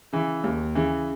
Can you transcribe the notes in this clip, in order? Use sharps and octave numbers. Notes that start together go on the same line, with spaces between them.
C#3 E3
D#2
C#3 E3